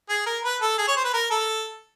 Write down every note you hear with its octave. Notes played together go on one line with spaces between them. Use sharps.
G#4
A#4
B4
A4
G#4
C#5
C5
B4
A#4
A4